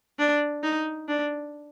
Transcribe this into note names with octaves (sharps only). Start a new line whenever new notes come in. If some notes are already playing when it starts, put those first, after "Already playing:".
D4
D#4
D4